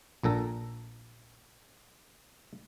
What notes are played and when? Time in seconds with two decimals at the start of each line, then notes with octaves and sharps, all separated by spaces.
0.23 A#1 A#2 A4 A#5